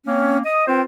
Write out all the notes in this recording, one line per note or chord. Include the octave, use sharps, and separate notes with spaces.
A#3 C4 C#4
D#5 D#6
C4 F4 B4 C5 G5